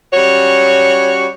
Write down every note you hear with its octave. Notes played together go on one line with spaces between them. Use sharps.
G3 C#4 F#4 C#5